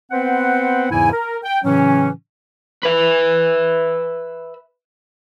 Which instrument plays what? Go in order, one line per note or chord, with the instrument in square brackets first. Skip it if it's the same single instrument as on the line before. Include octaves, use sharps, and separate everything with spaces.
[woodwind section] B3 C4 B4 C5 F#5
E2 G#2 C#3 E3 E4 G#5
A#4
G5
A2 C#3 E3 F#3 C#4
[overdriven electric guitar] B4 E5